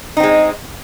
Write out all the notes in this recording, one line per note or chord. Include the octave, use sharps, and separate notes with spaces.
G#3 C4 D#4